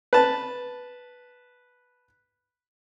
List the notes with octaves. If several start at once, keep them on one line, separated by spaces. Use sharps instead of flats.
B4 A5